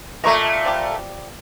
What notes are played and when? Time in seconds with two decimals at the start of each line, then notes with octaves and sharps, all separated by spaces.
0.24 A#2 A3 D#5 A#5 C#6
0.65 F3 G3 G4